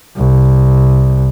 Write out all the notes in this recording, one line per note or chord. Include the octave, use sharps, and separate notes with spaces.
C2